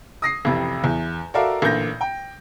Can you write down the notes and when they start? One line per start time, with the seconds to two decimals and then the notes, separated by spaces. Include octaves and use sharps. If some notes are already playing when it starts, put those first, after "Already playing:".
0.22 D#6 A#6 C7
0.45 A1 F2 C3
0.84 E2
1.34 F#4 A4 A#4 D5 E5 F5
1.62 A1 A#2 D3 G6 A#6
2.01 G5